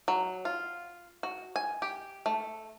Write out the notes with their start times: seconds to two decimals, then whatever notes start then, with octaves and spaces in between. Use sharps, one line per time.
0.08 F#3
0.45 F4
1.23 F#4
1.56 G#5
1.82 G4
2.26 A3